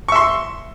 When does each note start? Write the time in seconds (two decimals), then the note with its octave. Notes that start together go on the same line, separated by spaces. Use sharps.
0.08 C#6
0.12 E5
0.16 C6